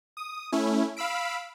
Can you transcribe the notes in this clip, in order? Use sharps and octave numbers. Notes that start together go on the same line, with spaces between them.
D#6
A3 C#4 E4
F5 B5 E6 B6 D7